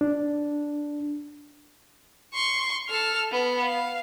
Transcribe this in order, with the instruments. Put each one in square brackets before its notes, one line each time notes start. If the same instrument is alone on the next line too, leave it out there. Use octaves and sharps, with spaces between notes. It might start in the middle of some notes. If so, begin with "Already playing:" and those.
[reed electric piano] D4
[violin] C6 C#6
A4 F6
B3
F5